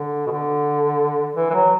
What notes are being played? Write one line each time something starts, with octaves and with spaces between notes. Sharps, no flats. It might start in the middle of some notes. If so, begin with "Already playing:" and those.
Already playing: D3
B2
D3
E3
E3
F#3